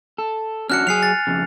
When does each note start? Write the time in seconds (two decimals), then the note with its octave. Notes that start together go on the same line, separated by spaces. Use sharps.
0.18 A4
0.70 C#4 D4 F#4 F6 F#6 C#7
0.87 F#3 G#4 G#5 C7 F7
1.03 A6
1.27 F2 C#3